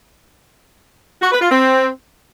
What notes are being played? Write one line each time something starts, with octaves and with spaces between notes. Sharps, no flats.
F#4
B4
F4
C4